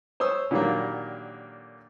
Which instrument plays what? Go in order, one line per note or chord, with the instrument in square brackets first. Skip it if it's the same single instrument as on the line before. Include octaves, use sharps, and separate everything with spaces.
[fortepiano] C5 C#5 D#6 E6
A#2 D3 D#3 F#3 G3 A#3